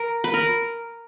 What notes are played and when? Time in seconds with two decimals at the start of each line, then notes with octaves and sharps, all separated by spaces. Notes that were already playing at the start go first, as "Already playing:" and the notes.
Already playing: A#4
0.24 B4
0.34 A#4